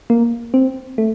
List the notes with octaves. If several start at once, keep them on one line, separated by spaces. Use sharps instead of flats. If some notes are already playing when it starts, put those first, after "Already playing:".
A#3
C4
A3